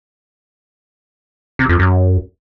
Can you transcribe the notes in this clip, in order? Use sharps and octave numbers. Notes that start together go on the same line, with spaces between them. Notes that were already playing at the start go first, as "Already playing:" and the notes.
C3
F2
F#2